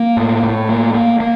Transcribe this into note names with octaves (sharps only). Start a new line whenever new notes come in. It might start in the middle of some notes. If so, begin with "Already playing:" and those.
Already playing: A#3
A2
A2
A#3
A#3
A#3